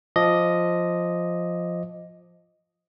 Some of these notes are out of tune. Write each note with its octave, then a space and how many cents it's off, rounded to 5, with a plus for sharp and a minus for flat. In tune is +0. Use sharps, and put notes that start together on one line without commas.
F3 +0 D#5 +0 D6 +0